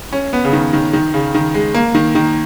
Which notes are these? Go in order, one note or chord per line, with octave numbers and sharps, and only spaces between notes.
C#4
B3
C#3
D#3
D#3
D#3
C#3
D#3
G#3
A#3
D#3
D#3